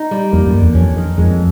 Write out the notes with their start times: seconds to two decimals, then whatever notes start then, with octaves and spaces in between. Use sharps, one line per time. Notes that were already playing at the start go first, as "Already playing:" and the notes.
Already playing: D#4
0.11 G3
0.32 F2 A#3
0.46 F#2
0.53 D3
0.61 E2
0.75 F2 C#4
0.96 D#3
1.17 F2 G#3